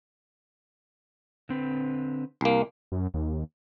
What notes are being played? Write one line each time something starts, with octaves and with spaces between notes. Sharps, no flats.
D3 C4 B4
C2 A#3
F#2
D#2